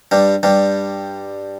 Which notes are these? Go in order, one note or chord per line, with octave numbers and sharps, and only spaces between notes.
G2 G3
G2 G3